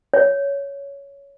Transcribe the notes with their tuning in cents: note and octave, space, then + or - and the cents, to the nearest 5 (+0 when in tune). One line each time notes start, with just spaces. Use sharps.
C#5 +15